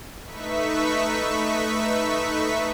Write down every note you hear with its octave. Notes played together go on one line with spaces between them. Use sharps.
A3 D#4 B4 E5 C#6 B6